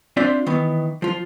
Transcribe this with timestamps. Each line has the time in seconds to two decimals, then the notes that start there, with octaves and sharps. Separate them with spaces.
0.17 C4 D4 F4 C5 D5 E5
0.46 D#3 E3 B3
1.02 F3 F4